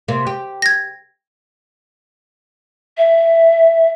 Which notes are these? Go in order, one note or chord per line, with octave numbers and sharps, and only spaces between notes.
C3 A#3
G4
G#6 A#6
E5